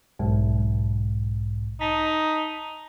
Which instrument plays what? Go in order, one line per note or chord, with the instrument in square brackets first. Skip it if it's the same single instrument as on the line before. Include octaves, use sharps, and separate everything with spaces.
[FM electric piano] B1 G#2
[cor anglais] D#4 [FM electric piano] A5 B6